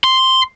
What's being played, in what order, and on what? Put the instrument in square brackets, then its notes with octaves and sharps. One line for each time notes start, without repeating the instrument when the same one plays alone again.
[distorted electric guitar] C6